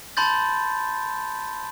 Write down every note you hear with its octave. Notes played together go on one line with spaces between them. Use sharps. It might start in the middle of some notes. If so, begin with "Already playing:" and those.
A5 B5 C6 G6 A6